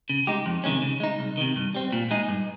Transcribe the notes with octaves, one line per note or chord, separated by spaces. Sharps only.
C#3
G#3 D#4 G4
F2
C3 D#3 G#3 C#4
C#3
G#3 D#4
C2
C3 D#3
G2
G3 C4
A#2
G#3 D#4 G#4
G2